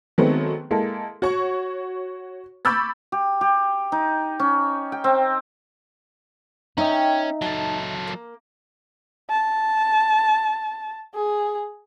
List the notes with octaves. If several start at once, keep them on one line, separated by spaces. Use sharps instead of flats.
D#3 F#3 G#3 A3 B3 C4
G#3 A#3 E4 A4
F#4 C#5 C#6
B5 C#6 D6 E6 G6 A6
G4
G4
D#4
C#4
G5
C4
C#4 D#4 D#5 E5 G5 A#5
F#3 A4 A5
A#3
A5
G#4